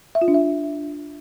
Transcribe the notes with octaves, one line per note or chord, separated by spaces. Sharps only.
E5
F4
D4
E5